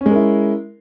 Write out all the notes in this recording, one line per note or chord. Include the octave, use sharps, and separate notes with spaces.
G#3 C#4 E4 A#4